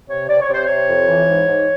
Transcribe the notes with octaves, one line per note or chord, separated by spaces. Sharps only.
C3 C#5
C3 D5
C#5
C3 C5
C3 C#5
F2
E3
G#2
G#2